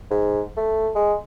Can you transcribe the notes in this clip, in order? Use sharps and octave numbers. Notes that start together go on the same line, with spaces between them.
G#2
A3
G#3